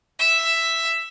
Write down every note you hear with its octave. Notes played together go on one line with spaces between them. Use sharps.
E5